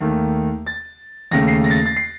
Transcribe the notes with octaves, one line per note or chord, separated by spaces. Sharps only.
D#2 D#3 A3
A6
D#2 C#3 A3 A#6
C7
A#6
A6
A#6
A6
C7